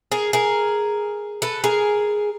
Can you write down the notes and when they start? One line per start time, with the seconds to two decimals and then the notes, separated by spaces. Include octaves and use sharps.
0.12 G#4 A#4
0.33 G#4 A#4
1.42 A4 B4
1.64 G#4 A#4